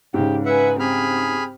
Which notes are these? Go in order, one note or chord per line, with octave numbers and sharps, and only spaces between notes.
G#2 C#3 G4
B4 E5 F#5 G#5
C4 G4 G#4 B5 F6